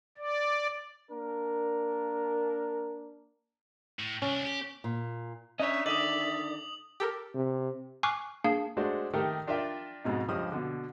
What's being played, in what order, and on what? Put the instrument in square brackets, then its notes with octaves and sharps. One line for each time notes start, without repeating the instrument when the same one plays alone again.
[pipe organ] D5
[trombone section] A#3 D4 A#4
[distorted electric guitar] A2
[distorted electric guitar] C2 D4 [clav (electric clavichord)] C#4
[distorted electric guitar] G4
[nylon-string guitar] A#2
[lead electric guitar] C#4 C#5 [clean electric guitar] D4 D#5 [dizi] E5
[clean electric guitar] D3 D#3 [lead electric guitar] D5 [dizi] E5 [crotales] D#6 F#7
[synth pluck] G4 A4 A#4
[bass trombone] C3
[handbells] G#5 C#6 D6 F6 F#6 C7
A#3 D4 G#4 F5 A5
[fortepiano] G#3 A3 D4 F#4 C5
D#3 A3 G4 A4 A#4
D4 F4 A#4 D5 E5 G5
F2 G#2 B2 D#4
C#2 G2 F3 D#5 D#6
B2 D3